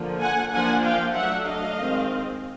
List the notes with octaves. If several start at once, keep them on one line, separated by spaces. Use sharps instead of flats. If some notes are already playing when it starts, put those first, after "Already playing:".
Already playing: D3 F3 A#3
F#5 G#5
F3 A#3 D4 F#5 G#5
F5 G5
F#3 A3 D4 E5 F#5
D#5 F5
D#3 G#3 C4